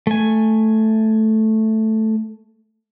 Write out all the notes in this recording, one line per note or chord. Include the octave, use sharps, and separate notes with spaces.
A3 G#5